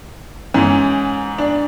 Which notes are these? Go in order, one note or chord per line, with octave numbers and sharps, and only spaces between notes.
G#2 E3 C#4
D4